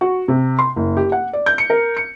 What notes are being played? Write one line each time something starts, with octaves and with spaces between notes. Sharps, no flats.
F#4
C3
C6
F#1
G4
F#5
D5
G6
C#7
A#4
C#7